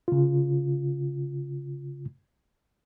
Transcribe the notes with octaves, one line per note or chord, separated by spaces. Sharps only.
C#3 F4